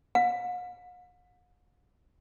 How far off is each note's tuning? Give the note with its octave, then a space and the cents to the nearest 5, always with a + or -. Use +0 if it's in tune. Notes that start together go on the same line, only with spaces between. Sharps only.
F#5 -45